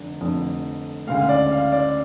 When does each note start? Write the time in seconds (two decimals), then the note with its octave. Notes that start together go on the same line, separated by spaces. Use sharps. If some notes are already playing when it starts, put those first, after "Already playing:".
Already playing: F1 D3
0.21 F1 F2 D3
1.07 D2 C#3 G#3 F5
1.29 D5
1.51 F5
1.72 D5